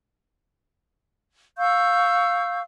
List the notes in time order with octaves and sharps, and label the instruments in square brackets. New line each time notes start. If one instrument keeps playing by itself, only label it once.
[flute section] F5 C#6 E6 G6